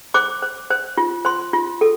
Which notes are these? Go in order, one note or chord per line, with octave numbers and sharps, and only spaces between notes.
C5 D6
C5
C5
F4
C5 C6
F4
A4